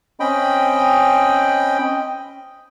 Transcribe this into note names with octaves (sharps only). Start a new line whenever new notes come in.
C4 C#4 D#5 G5 B5